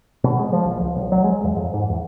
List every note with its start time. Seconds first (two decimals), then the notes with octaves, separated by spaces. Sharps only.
0.24 B2
0.39 G#3
0.53 F3
0.65 A#1
0.80 C#2
0.95 B1
1.12 F#3
1.24 G#3
1.44 E2
1.56 F2
1.74 G#2
1.90 E2